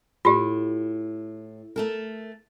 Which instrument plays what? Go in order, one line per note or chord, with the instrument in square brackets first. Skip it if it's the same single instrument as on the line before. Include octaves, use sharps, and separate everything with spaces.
[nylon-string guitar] A2 [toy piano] F4 G4
[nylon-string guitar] A3 A4 A#4